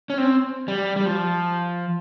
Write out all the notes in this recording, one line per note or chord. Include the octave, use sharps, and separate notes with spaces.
C#4
C4
G3
G3
F3